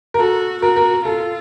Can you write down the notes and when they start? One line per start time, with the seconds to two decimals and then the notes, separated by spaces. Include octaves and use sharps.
0.14 A#4
0.19 F#4 A4
0.62 F#4 A#4
0.76 A#4
1.05 F4 A4